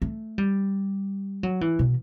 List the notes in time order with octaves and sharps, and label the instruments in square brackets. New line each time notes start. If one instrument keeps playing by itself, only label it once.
[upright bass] A3
G3
F#3
E3
B2